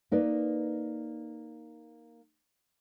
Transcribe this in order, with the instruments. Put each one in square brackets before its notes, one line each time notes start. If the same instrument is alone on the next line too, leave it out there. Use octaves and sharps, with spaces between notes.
[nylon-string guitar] A#3 D#4 B4 D5